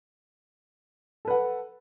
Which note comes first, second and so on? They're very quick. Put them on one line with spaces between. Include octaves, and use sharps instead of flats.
A4 B4 F#5